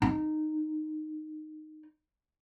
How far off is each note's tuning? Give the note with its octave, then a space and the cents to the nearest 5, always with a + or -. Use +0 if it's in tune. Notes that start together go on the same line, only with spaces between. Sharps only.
D#4 -10